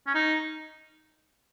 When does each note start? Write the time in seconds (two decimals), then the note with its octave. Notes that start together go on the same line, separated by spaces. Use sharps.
0.07 C#4
0.15 D#4